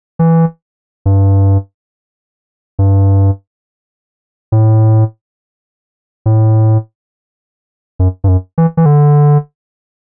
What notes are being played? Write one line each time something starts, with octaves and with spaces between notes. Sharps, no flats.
E3
G2
G2
A2
A2
F#2
G2
F#2
E3
E3
D3